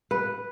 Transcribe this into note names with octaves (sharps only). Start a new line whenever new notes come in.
B4